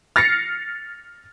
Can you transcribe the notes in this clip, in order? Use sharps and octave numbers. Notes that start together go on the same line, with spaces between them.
F6 A6 A#6 C7 C#7